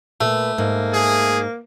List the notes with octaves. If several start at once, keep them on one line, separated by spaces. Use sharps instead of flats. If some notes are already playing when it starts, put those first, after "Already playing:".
A#2 A3 B4
G#2 A#3
G#4